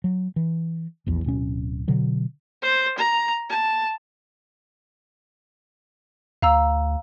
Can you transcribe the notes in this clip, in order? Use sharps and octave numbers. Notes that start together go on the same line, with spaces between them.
F#3
E3
A#1 E2
D1 B2 C#4
B2 D3 F#3
C5
A#5
A5
D2 F5 A#5 E6